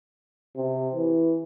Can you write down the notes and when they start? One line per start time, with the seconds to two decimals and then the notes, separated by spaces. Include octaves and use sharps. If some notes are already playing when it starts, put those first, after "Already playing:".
0.56 C3
0.94 E3